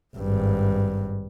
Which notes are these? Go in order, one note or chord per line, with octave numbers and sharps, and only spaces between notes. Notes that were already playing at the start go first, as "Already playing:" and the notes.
G#1 G2